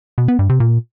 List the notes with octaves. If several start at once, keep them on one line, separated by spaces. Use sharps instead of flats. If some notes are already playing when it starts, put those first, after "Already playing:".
B2
B3
G2
C3
A#2